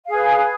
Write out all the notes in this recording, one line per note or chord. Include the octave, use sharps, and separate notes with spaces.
G#4 B4 F5